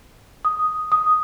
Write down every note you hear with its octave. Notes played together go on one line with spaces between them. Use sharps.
D#6
D#6